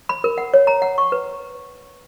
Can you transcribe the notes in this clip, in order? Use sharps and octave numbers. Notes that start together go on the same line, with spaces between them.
B5
A#4
F#5
C#5
A#5
F#5
C#6
B4